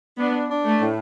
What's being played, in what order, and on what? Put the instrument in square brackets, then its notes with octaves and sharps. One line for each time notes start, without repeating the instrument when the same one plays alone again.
[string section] B3 [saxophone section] D4
[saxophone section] D4
[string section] A3
[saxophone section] A2